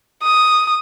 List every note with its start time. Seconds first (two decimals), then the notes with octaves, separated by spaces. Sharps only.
0.23 D#6